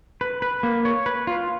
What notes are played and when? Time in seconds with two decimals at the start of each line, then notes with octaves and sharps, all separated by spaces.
0.21 B4
0.42 B4
0.63 A#3
0.85 C#5
1.06 B4
1.27 F4